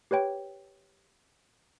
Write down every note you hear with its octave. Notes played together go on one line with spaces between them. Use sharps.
G4 B4 C#5 G5